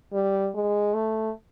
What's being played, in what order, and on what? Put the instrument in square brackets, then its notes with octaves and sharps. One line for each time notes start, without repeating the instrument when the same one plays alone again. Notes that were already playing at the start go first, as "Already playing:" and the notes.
[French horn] G3
G#3
A3